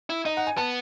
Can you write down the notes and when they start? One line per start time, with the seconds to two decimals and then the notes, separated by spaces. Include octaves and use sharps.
0.10 E4
0.25 D#4 D#5
0.37 F#5
0.47 G#5
0.57 B3 A5